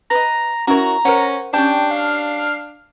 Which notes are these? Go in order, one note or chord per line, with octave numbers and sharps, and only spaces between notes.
B4 D#5 A#5
C#4 E4 F#4 A#4 A#5
C#4 A#4 C5 F#5
C#4 D4 G4 G5 A5
F5